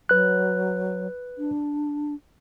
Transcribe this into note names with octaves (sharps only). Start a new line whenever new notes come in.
F#3 B4 F#6
D4